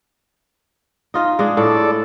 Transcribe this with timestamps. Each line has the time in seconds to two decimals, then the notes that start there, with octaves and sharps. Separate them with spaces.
1.14 D#4 F4 D#5
1.39 G#3 D4
1.57 A2 A4 D5